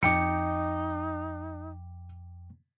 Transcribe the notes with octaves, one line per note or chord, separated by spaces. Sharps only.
F2 D#4 G5 D6 C#7